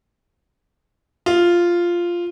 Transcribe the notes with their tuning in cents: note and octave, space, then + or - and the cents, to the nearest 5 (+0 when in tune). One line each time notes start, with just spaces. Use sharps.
F4 -5